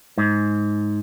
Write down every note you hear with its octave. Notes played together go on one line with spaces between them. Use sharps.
G#2